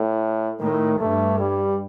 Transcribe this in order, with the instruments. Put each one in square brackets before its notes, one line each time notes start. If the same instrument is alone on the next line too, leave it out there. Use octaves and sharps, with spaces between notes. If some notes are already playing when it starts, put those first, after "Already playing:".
Already playing: [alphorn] A2
[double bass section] A2 [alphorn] D#3
[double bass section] G2 [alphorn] A3
[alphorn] G3